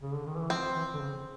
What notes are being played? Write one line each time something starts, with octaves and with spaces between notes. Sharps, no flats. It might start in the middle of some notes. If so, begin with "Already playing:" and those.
C#3
D3
D#3
E3
F3 C4
E3
D3
C#3